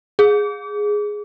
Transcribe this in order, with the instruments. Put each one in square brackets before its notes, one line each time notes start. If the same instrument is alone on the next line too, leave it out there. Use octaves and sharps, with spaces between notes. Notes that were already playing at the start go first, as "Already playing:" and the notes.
[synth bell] G#4